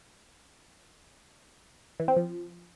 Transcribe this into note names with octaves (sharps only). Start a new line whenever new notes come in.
E3
C4
F3